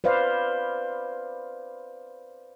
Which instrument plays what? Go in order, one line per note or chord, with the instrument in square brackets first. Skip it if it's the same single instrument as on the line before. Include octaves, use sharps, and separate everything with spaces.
[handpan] B4 C5 D5 F5